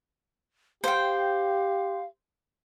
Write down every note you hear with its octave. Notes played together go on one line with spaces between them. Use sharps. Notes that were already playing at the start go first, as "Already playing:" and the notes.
G4 C5 F5 G5